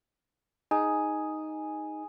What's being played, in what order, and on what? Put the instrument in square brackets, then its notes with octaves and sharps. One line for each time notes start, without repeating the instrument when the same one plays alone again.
[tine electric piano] D#4 [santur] G#4